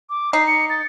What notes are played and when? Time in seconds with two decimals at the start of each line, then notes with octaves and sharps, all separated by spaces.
0.10 D6
0.33 D#4 C7
0.47 C#7
0.70 A6